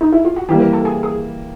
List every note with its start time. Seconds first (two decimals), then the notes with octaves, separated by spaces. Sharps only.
0.01 D#4
0.13 E4
0.25 F4
0.36 F#4
0.49 E3 G3 A#3 G4
0.60 A#4
0.73 A4
0.85 G#4
1.03 G#4